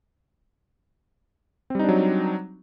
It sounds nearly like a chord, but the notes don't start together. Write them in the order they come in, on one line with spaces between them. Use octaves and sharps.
C4 G3 D#4 D4 F#3